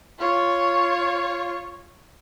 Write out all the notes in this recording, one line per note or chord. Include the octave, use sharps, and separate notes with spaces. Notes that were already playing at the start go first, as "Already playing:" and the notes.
F4 C#5